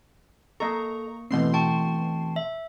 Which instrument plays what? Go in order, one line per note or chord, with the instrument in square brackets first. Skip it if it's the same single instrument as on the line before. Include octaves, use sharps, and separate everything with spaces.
[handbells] A#3 C#6 [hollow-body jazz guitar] A4 D#5 [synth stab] A#5
[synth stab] B2 C6 C7 [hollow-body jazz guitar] E3 A3 C4
[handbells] G5 A5 C#6
E5